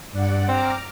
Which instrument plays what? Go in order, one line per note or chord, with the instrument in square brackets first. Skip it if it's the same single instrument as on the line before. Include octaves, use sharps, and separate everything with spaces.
[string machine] G2 D5 F#5
[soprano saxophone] C4 [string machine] A#5 D6 F6